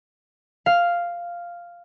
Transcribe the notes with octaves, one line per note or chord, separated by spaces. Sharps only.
F5